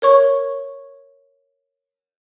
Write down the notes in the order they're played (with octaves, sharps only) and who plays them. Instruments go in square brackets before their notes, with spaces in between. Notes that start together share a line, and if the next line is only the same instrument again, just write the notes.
[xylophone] A#4 C#5 C#6